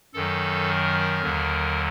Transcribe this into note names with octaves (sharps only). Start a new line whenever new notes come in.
F#2 D#3 F#3 A4
A#4
D#2 D3 F#3